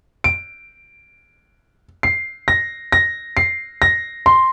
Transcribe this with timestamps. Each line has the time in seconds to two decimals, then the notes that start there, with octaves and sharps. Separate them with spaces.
0.24 D7
2.03 C7
2.48 A#6
2.92 A#6
3.37 C7
3.82 A#6
4.26 C6